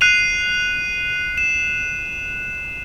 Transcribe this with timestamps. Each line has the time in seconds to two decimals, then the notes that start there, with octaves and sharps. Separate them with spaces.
0.01 F#6 C7 D#7 F7
1.38 E7